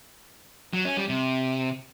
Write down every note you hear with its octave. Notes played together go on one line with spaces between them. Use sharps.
F#3
C#4
G3
C3